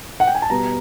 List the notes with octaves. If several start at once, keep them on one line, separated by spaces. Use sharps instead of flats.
F#5
G5
G#5
A5
B2 G3 B3 A#5